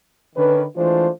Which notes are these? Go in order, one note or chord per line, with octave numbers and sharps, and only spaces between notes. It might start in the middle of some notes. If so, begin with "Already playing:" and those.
D3 D#3 C#4 D4 B4
E3 G#3 A3 D4 F4 C5